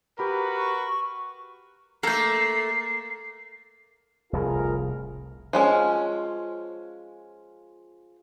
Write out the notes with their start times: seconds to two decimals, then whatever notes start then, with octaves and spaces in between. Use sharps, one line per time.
0.19 F#4 G4 A#4 B4 B5
0.57 C#6
2.03 A3 A#3 A4 G6 C7
4.33 F1 C2 A2 F4 G#4 A#4
5.53 F3 G#3 C#4